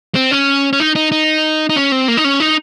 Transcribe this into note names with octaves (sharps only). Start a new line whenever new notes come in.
C4
C#4
C#4
D#4
D#4
D#4
D#4
C#4
C4
A#3
D#4
C#4
D#4